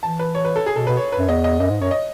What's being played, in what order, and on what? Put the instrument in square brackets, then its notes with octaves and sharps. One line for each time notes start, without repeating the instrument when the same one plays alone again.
[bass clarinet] E3 [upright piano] A5
[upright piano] B4
C#5
B4
A4
G#4
[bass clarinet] B2 [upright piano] A4
[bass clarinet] B2 [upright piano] B4
[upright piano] C#5
B4
[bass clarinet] F#2
[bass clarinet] E2 [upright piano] D#5
[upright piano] D#5
[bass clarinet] F#2 [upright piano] D#5
[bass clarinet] G#2
[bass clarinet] F#2 [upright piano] C#5
[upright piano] D#5